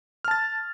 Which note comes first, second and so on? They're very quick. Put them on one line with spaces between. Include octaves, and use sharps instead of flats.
F6 A5 A6